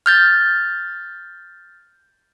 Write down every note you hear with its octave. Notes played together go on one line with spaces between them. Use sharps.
F6 G6 A6